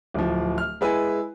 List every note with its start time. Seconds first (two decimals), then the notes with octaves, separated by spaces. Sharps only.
0.14 D1 F3
0.58 F6
0.81 G#3 E4 B4 G#5